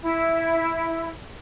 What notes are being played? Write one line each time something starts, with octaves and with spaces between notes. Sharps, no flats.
E4